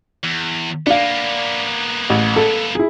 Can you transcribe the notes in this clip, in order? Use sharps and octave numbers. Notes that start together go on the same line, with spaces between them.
E2
A#3 B3 D4 F5
A1
A4
E4 G#4